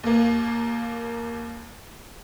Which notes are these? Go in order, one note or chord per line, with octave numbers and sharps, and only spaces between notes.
D#2 A#3